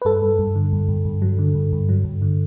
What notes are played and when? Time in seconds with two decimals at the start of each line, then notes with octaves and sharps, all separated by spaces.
0.02 B4
0.05 G2 A4
0.22 G2
0.39 G2
0.55 D3
0.73 G2
0.88 G2
1.05 G2
1.22 F#3
1.39 D3
1.55 G2
1.73 G2
1.89 F#3
2.05 G2
2.22 D3